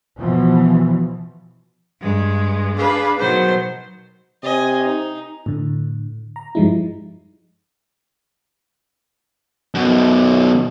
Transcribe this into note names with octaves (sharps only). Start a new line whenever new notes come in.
B2 E3 F3
G2 G#3
D4 G#4 B4 F5
B2 D#3 F#3 C5
C3 D#5 G#5
D#4
A2 D3
A#5
G2 F3 G3 G#3 D#4 E4
F#2 B2